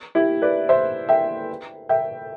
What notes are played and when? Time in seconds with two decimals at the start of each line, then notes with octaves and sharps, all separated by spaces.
0.15 E4 G4
0.42 B4 D5
0.69 C5 E5
1.09 E5 G5
1.89 E5 G5